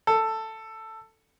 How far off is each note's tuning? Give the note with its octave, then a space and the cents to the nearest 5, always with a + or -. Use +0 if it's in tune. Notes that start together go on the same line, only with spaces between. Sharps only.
A4 +10